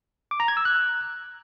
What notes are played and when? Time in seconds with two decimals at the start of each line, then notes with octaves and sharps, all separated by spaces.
0.31 D6
0.40 A#5
0.48 G#6
0.57 E6
0.65 F#6